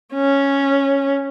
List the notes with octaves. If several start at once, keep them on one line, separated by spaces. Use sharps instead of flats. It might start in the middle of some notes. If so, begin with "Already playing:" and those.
C#4